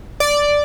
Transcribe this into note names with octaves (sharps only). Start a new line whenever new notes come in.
D5